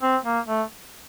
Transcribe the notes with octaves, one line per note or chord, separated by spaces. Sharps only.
C4
A#3
A3